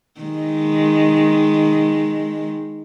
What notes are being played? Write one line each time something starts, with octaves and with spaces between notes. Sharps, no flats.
D#3 G#3